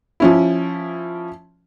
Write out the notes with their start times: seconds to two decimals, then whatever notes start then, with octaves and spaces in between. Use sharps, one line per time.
0.20 F3 C#4 E4